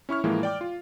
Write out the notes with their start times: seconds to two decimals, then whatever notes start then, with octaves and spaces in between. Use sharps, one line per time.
0.09 C#4 E4 C#6 F6
0.24 A2 E3 F3 G#3 A#3
0.43 D5 G5 D6
0.61 F4